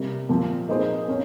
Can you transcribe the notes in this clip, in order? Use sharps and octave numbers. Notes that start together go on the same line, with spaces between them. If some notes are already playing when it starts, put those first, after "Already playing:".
Already playing: C3 G3 A#3
A#2 F3 C4
A#3 D#4 G#4 C5
A#3 C#4